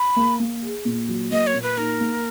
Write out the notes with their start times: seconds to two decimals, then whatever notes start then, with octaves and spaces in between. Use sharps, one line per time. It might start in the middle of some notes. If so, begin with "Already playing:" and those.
Already playing: B5
0.16 A#3
0.40 A#3
0.63 G#4
0.85 A#2
1.08 F#3
1.31 A#3 D#5
1.47 C#5
1.54 A#2
1.62 B4
1.77 D#4 A#4
2.00 A#3